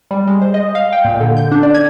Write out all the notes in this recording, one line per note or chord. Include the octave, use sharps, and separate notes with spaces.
G3
G#3
C5
D#5
F5
G5
A#2
D3
G6
D4
D5
G#6